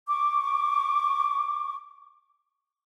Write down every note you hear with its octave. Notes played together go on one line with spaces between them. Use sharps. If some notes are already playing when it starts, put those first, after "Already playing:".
C#6 D6